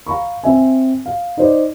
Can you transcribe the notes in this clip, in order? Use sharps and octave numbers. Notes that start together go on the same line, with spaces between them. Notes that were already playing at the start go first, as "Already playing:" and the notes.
F5 A#5 B5 C#6
C4 E5 G#5
F5
D#4 C5 D5